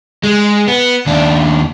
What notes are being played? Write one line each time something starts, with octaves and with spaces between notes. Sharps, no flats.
G#3
B3
D#2 D4